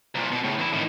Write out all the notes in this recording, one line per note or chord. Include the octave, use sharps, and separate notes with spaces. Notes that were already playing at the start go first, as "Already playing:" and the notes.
C2 A#2
B2
A2 C#3
E2 E4
A2 D#3